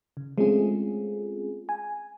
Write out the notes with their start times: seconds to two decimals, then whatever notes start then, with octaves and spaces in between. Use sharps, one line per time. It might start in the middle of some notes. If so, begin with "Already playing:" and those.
0.17 C#3
0.38 G#3 A3 C4 C#4 F4 G#4
1.69 G#5